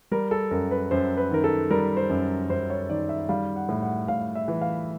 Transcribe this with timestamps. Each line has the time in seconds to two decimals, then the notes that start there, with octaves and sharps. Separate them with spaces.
0.11 G3 A#4
0.31 A4
0.51 F#2 A#4
0.71 B4
0.91 F#2 C5
1.17 B4
1.31 D#3 A#4
1.44 A4
1.70 G3 A#4
1.97 C5
2.09 F#2
2.50 F#2 C5
2.70 C#5
2.89 D#3 D5
3.09 E5
3.29 G3 F5
3.56 F#5
3.69 A2
3.82 F#5
4.08 A2 F5
4.35 E5
4.48 E3
4.61 F5